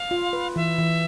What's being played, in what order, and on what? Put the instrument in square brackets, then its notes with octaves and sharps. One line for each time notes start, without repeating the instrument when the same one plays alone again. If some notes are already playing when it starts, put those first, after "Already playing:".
Already playing: [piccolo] F5
[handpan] F4
B4
[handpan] E3 [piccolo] E5
[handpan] E3